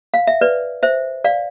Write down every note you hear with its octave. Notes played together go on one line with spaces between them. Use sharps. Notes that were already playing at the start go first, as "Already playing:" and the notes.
F5
E5
B4 D5
C5 E5
D5 F5